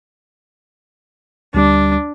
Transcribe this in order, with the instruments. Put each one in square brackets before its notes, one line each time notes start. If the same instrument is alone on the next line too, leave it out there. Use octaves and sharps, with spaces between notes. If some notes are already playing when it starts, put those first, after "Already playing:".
[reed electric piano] D2 G3 [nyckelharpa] D4